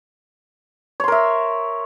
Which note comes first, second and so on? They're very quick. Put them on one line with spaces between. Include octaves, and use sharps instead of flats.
C#5 C6 A#4 E5